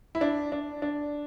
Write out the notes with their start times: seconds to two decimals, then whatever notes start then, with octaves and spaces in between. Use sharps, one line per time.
0.15 E4
0.21 D4
0.52 D4
0.82 D4